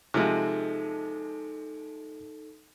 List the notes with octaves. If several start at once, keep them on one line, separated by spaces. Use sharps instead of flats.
C3 F3 G#3 D#4 A4